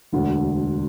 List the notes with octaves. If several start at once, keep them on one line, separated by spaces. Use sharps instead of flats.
E1 D2 D3